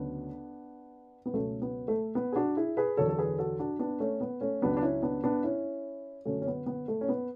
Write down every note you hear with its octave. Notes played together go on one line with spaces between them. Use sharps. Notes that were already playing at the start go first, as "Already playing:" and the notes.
Already playing: D2 C#3 F#3 B3 D4
B3
C#2 B2 F#3 A3 C#4
B3
A3
B3
G#4
D4 F#4
E4 G#4
G#4 B4
E2 D3 F#3 A4 C#5
A4
G#4 B4
F#4 A4
D4 F#4
B3 D4
A3 C#4
B3
A3 C#4
C#2 C#3 F#3 B3 D4
D4
C#4 E4
B3 D4
B3 D4
C#4 E4
F#2 D3 F#3 A3 C#4
C#4
B3
B3
A3
C#4
B3